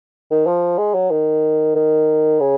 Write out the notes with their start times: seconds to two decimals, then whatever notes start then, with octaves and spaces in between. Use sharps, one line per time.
0.31 D#3
0.46 F3
0.78 G#3
0.94 F#3
1.11 D#3
1.75 D#3
2.40 C#3